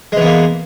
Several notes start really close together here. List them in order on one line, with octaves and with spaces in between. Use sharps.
G#3 E3 B3 A#3